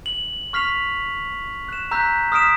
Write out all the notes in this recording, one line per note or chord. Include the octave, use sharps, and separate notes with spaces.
F#7
C#6 F6 B6 C7 F7
F#6 E7
A#5 E6 F#6 G6 B6
D#6 F6 B6 D7 E7